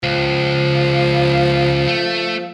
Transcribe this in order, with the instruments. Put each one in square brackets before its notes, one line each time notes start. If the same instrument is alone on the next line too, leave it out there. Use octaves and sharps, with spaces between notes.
[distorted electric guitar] C#2 [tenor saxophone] F3
[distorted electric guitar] A3